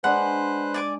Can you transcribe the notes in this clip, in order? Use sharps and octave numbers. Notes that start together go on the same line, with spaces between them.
G#3 D4 B4 C5 F#5 F#6
D5 G#5 D6